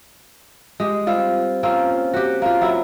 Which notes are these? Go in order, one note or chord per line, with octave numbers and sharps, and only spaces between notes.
G#3 G4
G3 C4 F4
A#3 C4 C#4 F4
F#4 G4
A#3 F4
F#3 E4